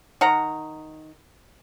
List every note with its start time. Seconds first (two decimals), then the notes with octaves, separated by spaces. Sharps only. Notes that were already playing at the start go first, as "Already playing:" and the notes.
0.21 D#3 F#5 A#5